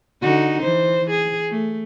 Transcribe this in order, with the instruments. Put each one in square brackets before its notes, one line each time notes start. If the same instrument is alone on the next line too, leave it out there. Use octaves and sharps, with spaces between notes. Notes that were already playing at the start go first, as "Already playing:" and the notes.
[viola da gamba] D3 D#4 F#4
E3 C5
G#4
A3